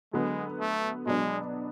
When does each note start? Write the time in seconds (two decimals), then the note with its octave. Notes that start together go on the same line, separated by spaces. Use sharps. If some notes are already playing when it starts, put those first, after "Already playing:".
0.13 D3 F#3 G#3 B3
0.59 A3
1.06 B2 F#3 G#3 B3 D4